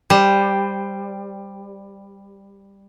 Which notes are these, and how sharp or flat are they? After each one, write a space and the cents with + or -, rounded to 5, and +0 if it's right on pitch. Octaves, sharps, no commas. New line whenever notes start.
G3 +10 C5 +0